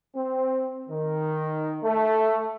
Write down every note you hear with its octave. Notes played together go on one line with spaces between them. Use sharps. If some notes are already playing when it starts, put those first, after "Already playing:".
C4
D#3
A3